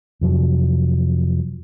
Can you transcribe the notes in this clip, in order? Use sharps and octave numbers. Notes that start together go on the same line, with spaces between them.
F2 C3 F3 F#3